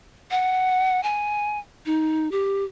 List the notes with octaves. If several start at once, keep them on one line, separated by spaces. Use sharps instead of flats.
F#5
G#5
D#4
G4